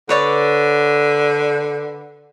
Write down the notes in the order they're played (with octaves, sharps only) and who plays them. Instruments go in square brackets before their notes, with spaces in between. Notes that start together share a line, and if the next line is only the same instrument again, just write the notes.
[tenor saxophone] D3 [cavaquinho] B4 C#5 D5